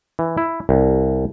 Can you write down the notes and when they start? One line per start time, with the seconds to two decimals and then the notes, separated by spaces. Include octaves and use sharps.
0.19 E3
0.38 E4
0.69 C2